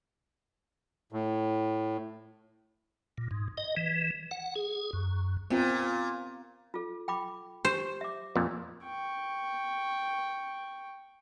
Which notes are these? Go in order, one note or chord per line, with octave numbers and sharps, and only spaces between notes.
A2
A#2
G#2
D#5
E3
F#5
G#4
F#2
A#2 B3 C4 F4
F4 A4
G5 B5 D6
G4 C5
E5 D6
F2 A#2
G5 C#6